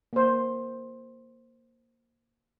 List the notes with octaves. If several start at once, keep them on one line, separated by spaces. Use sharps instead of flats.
A#3 C5